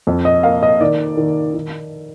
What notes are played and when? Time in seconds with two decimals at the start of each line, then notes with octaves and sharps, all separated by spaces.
0.07 F2
0.25 D#5
0.43 A#3 F5
0.63 D#5
0.81 D#3 D5
1.17 D#3
1.54 D#3